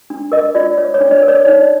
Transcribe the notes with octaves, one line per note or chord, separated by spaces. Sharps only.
D4
A#4 D#5
F4 D5
C#5
C#5
D4
D5
A#4
C#5
D#4 D5